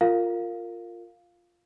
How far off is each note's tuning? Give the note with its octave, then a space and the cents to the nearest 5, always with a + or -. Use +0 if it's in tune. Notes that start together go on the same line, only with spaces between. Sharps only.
F4 +0 A#4 -20 F5 +0